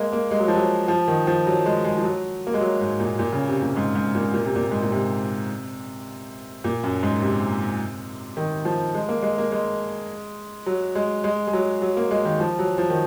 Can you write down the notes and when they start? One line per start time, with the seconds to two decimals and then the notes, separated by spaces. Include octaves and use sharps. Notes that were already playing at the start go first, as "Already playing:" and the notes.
Already playing: G#3 A#3
0.13 A#3
0.31 G#3
0.40 F#3
0.48 F3
0.56 F#3
0.88 F3
1.08 D#3
1.27 F3
1.47 F#3
1.66 G#3
1.84 G#3
1.98 F3
2.04 F#3
2.47 A#3
2.54 G#3
2.61 F#3
2.80 G#2
3.00 A#2
3.19 A#2
3.33 C#3
3.48 C3
3.62 A#2
3.76 G#2
3.95 G#2
4.15 A#2
4.33 A#2
4.44 C3
4.56 A#2
4.71 G#2
4.82 A#2
4.92 C3
6.64 A#2
6.83 F#2
7.03 G#2
7.22 C3
8.37 D#3
8.65 F3
8.94 G#3
9.09 A#3
9.22 G#3
9.38 A#3
9.52 G#3
10.66 F#3
10.95 G#3
11.24 G#3
11.47 G#3
11.53 F#3
11.82 F#3
11.97 A#3
12.11 G#3
12.25 D#3
12.40 F3
12.59 F#3
12.78 F3
12.90 D#3